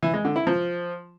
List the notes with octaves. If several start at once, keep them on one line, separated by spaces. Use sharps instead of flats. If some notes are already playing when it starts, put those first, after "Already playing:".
E3
G#3
D3
E4
F3